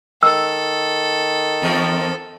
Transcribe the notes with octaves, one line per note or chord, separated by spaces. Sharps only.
D#3 A4 E6
E2 F3 A#4